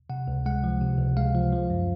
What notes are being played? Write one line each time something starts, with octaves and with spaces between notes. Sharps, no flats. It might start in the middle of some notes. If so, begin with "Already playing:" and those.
C3 F#5
C#2
G#3 F#5
F3
C3
C#2
G#3 F5
F3
F3
F#2